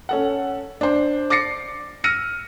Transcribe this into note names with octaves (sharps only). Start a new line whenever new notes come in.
C#4 A4 F#5
D4 C5
D6 A6 A#6 C7 C#7
E6 F6 A#6 C#7 D#7